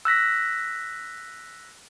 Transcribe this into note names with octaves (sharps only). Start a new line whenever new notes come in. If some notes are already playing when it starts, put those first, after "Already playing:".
E6 F#6 A#6 B6